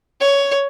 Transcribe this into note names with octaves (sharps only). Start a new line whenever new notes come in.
C#5